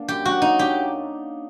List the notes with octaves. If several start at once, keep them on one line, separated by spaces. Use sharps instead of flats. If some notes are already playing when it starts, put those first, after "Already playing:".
Already playing: A#3 D4
F#2 G4
F#3 F#4
A#3 D#4
D4 G4